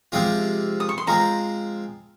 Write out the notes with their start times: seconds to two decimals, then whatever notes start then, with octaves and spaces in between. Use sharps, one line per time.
0.12 C3 F3 G#3 C4 F4
0.80 D#6
0.89 C#6
0.98 C6
1.07 F3 G#3 C4 A#5